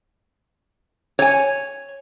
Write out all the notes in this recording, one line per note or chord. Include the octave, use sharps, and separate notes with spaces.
C#5 G#5